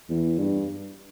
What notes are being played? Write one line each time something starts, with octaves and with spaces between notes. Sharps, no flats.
E2
G2